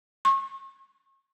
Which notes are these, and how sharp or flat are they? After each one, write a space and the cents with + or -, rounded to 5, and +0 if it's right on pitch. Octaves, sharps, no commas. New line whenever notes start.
C#6 -35